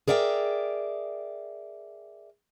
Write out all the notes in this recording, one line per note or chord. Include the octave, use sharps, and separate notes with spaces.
G#4 A#4 D5 E5 F#5 G5